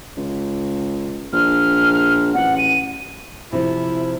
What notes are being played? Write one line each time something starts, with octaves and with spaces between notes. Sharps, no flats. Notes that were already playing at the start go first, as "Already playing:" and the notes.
C#2
A#1 F6
A1 F#5
D#7
C3 F3 E4